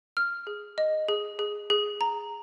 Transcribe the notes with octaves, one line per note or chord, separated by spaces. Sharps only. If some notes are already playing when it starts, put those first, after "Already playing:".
F6
G#4
D#5
G#4
G#4
G#4
A#5